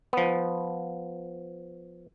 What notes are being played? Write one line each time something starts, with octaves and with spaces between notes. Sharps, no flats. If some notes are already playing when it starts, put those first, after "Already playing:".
F3 B3